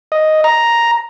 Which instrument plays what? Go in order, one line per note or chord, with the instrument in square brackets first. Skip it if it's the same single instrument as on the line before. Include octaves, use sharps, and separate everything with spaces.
[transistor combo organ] D#5
A#5